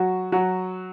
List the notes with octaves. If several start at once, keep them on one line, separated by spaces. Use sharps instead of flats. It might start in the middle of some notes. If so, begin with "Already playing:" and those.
Already playing: F#3 F#4
F#3 F#4